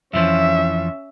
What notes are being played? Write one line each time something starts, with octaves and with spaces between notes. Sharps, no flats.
F2 E3 F3 C#4 E5